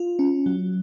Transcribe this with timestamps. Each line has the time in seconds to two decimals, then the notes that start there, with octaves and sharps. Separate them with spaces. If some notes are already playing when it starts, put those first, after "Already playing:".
Already playing: F4
0.19 C#4
0.46 F#3